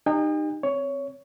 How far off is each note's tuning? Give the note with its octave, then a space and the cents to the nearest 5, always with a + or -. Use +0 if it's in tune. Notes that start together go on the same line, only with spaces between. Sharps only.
D#4 -25 G4 +0 G5 +45
C4 +0 C#5 +15